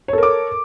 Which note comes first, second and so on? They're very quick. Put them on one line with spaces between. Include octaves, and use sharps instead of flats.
C#5 A4 A#4 D6